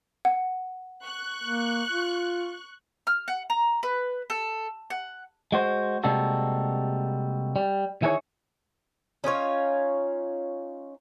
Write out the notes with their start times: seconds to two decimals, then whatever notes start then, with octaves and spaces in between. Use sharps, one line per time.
0.25 F#5
1.03 C#6 F#6
1.44 A#3
1.92 F4
3.07 F6
3.28 F#5
3.50 A#5
3.83 B4
4.30 A4
4.90 F#5
5.52 G#3 F#4 C5
6.04 C3 G3 G#3 A#3 F#4 A4
7.56 G3
8.02 D#3 E4 G#4 A#4 C#5
9.24 C#4 D#4 F4 C#5